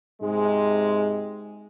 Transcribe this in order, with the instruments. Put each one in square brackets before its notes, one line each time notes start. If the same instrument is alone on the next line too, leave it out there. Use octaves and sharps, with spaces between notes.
[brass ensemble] G#2 C3 G#3